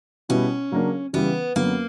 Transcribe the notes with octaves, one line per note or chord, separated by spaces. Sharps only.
B2 G3 B3 C#4 E4
C#3 F#3 A#3 D4
C#3 E3 G3 B3
F#2 D3 F#3 A#3 B3